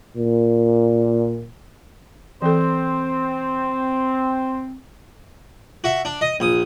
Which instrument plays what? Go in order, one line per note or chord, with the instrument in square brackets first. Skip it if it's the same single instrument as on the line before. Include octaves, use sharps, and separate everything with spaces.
[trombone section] A#2
[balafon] E3 A4 [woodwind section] C4 [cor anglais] C5
[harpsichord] F#4 E5
D4
D#5
A#1 D#6